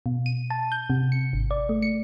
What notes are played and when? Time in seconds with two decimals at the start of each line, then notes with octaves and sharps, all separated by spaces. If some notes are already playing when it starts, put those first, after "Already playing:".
0.06 B2
0.26 D#7
0.50 A5
0.72 G6
0.90 C3
1.12 C#7
1.33 G#1
1.51 D5
1.69 A3
1.82 C#7